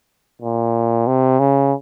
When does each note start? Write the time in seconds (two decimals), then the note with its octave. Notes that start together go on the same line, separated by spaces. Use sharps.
0.42 A#2
1.07 C3
1.39 C#3